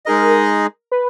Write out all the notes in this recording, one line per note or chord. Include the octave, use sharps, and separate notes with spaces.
G#3 D#4 G#4 A#4 D#5
B4